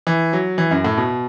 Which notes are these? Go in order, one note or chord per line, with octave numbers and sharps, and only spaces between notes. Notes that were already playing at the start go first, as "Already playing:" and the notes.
E3
F#3
E3
F#2
A2
B2